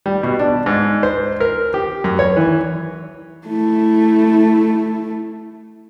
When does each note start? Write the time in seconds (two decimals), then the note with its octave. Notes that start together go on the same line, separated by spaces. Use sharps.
0.06 G3
0.23 B2
0.39 D4
0.66 G#2
1.03 C5
1.40 A#4
1.74 G4
2.04 F#2
2.19 C#5
2.36 E3
3.46 A3 E4